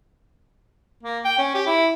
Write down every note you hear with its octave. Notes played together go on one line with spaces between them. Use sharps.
A#3
G5
C#4
G4
E4